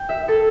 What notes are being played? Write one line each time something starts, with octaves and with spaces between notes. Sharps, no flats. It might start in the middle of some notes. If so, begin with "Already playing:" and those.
Already playing: G5
E5
A4